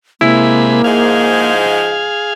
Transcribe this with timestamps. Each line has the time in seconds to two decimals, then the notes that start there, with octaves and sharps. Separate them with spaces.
0.21 C3 G#3 A#3 E4 B5
0.84 G#2 F3 G#3 G#4 F5